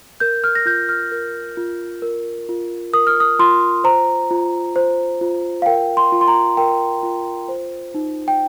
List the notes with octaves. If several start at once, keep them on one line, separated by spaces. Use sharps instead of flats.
A#4 G6
F6
A#6
F4 G6
F6
A#4
F4
A#4
F4
A#4 D#6
F6
D#6
F4 C6
C5 A#5
F4
C5
F4
F5
A#4 G5
C6
F4
C6
A#5
A#4 G5
F4
C5
D#4
G5